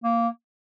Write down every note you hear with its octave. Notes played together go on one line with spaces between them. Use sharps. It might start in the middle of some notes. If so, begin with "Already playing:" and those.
A#3